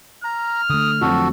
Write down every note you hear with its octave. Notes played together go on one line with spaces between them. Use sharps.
A#5 F6
D3 A3 D#6
F2 F#3 F#4 A4